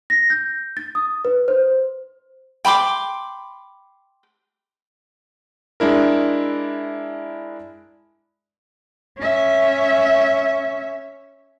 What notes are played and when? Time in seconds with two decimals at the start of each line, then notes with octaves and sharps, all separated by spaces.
0.10 A#6
0.30 G6
0.77 A6
0.95 D#6
1.25 B4
1.48 C5
2.65 G5 B5 C6 D6
5.80 G#3 D4 E4 A#4
9.18 C#4 E5